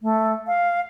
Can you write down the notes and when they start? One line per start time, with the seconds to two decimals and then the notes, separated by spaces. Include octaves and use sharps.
0.02 A3
0.47 F5